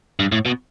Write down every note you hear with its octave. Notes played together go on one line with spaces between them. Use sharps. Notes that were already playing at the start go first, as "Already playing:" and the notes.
G2
A2
B2